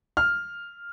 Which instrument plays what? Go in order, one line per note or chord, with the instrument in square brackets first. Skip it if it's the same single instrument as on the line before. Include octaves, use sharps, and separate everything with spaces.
[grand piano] F6